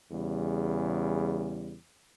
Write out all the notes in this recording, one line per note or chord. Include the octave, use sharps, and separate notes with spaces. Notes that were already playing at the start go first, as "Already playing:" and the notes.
E2 C#3 G3